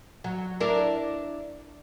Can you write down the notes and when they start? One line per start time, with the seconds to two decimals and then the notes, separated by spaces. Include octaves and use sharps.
0.24 F#3
0.60 D4 E4 A#4